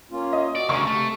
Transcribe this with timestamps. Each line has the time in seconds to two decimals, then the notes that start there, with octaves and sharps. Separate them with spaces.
0.11 A#3 C#4 F4
0.33 D#5
0.56 F#4 D5
0.69 D2 C#3 A#4 C#6
0.87 C3 A3